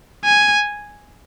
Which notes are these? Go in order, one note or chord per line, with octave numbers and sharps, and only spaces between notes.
G#5